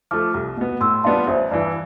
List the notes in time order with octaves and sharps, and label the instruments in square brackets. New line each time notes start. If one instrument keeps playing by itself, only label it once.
[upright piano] F3 A3 [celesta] D6 F6
[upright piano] C2
B2 B3
[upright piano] A2 [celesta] C6 E6
[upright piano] G3 B3 D4 F4 [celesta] A5 C6
[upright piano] A1 [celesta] C5 E5
[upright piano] G2 E3 [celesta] D5 F5